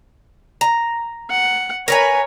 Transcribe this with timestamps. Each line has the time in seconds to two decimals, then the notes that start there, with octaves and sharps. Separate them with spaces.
0.61 A#5
1.30 F#5
1.88 A#4 B4 C#5 G#5